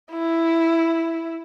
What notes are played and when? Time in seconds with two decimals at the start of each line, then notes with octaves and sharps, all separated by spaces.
0.12 E4